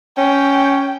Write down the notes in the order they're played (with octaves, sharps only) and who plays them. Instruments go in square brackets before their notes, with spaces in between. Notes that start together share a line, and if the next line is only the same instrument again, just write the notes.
[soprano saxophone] C#4 [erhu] G5